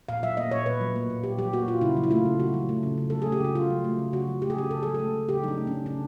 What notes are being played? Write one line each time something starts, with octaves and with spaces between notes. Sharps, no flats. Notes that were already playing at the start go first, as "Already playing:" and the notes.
A#2 F5
F#3 E5
A#3 D#5
A#2 C#5
A#2 B4
F#3
A#3
A#2
A#2 G4
F#3 G4
A#3 F#4
A#2 F4
C#3 E4
F#3
E4
A3 F4
C#3
C#3 F#4
F#3
A3
C#3
C#3
F#3 A4
A3 G#4
G4
C#3 F#4
C#3 F4
F#3
A3
C#3
C#3 F#4
F#3
A3 G4
G#4
C#3 G4
C#3 A4
F#3 G#4
A4
A3
C#3
C#3 G4
F#3 D#4
D4
A3
C#3 C#4
C#3 D4